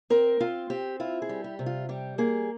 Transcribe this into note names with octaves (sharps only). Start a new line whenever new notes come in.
C4 A#4
C4 F4
C4 G4
E4 F4
G#4
G3
G4
C3
F4
G3 G4
A#3 G#4